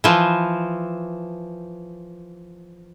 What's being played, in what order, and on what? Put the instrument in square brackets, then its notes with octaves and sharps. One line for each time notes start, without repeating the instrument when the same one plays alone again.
[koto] E3 F3